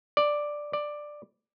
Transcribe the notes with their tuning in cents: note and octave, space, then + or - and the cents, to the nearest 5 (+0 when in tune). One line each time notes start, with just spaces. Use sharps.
D5 +5
D5 +10